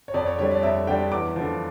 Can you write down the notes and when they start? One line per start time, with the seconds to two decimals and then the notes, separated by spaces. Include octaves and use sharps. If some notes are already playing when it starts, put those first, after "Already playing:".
0.08 C#5
0.14 F2 D5
0.26 C#5
0.38 D3 G3 C#5
0.51 D5
0.63 F2 E5
0.87 D3 G3 G5
1.12 E2 D6
1.36 D3 F3